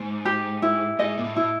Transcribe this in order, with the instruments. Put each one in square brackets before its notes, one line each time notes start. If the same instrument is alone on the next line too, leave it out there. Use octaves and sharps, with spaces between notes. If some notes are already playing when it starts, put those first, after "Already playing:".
Already playing: [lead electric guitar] G#2
[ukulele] G4
E4
[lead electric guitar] G#2 [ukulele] D#5
[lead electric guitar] A#2
A2
[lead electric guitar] A2 [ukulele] E4